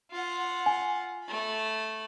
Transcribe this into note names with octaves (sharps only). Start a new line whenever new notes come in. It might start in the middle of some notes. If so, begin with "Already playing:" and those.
F4 F#5
G#5
A3 B5